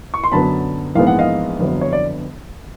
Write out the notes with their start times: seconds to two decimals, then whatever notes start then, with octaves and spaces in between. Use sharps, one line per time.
0.14 C#6
0.24 C6
0.32 F#2 D3 F#3 B3 A5 B5
0.95 A#1 G#2 E3 G#3 B3 F5
1.07 F#5
1.19 D#5 F5
1.59 G1 F2 D3 F#3 B3
1.81 C#5
1.93 D5